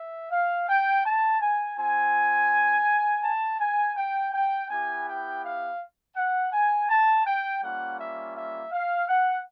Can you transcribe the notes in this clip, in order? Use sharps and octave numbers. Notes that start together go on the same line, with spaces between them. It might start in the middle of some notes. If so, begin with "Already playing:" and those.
Already playing: E5
F5
G5
A5
G#5
C4 F4 G#5
A5
G#5
G5
G5
B3 E4 G4 G#5
G5
F5
F#5
G#5
A5
G5
G3 A#3 C#4 F4 F#5
E5
E5
F5
F#5